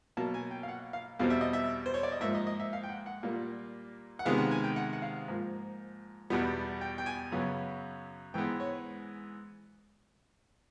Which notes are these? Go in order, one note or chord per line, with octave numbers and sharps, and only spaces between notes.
B2 F#3 A#3 A5
G#5
G5
F5
F#5
F5
E2 B2 G3 C4 F5
E5
D#5
E5
C5
C#5
D5
D#5
G#2 F3 A#3 E5
D#5
D#5
E5
F5
G5
F#5
F#5
A#2 G3 A#3
F#5
C3 D#3 G#3 B3 F5
F#5
G#5
G5
F#5
F#5
F5
G#2 F3 A#3
E2 B2 G3 B3
G5
G5
G#5
F#2 C#3 F#3 B3
G#2 E3 G#3 B3 G5
C#5